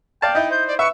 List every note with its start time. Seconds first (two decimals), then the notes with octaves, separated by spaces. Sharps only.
0.22 D5 F5 G5 A5
0.35 D#4 E4 D#5 G6
0.51 C5 G6
0.67 D5
0.79 B4 E5 C#6